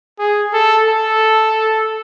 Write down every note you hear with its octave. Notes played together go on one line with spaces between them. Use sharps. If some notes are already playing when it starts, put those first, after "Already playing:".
G#4
A4
A4